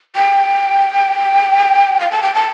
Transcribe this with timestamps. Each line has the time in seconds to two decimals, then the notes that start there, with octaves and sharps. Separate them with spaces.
0.16 G5
2.00 F5
2.11 A5
2.23 G5
2.35 A5